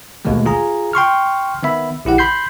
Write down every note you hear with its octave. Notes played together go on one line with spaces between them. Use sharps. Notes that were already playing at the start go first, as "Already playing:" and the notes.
A1 D#2 B2 D#3 G#3 A3
F4 G#4 A#5
G5 C6 C#6 F6
D#3 B3 E5 B5
A#1 E4 G4 F#5
B5 C6 G6 C7